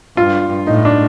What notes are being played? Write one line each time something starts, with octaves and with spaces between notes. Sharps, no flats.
G2 F4
A2 D#4
D4